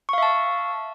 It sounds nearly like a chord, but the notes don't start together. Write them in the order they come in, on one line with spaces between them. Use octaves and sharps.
C#6 F5 E5 A5